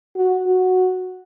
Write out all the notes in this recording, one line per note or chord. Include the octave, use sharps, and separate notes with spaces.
F#4
F#4